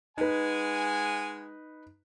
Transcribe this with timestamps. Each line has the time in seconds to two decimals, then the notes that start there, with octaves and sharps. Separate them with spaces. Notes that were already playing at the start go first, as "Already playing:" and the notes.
0.18 G#3 D#4 B4 F#5 G#5